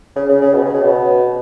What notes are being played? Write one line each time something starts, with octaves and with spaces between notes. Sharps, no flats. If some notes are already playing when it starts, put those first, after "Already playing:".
C#3
C#3
C#3
B2
C#3
C#3
B2